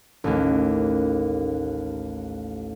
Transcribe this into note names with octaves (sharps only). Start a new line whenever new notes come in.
A1 D#2